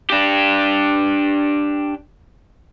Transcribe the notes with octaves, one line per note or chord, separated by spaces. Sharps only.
D4 G4